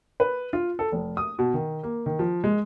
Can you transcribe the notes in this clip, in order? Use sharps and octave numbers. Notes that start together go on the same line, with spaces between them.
B4
F4
A4
F1
D#6
B2
D#3
A#3
D#3
F3
G#3